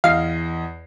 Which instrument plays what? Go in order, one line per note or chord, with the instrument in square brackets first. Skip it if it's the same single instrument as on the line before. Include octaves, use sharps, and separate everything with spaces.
[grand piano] E2 D#5 C7 [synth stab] F5